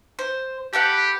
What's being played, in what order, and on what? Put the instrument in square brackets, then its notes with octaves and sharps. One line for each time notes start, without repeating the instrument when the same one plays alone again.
[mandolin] C5
[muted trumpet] G4 [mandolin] A4 B4 F#5